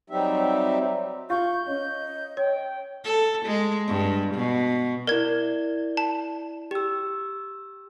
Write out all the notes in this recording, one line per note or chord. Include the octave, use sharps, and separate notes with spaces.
F#3 G3 C4 D#4 G4 E5
F4 C#6 G6
C#4 D#5
C#5 G5
A4
G#3
G2
B2
E4 A#4 D5 G#6
A5
G4 E6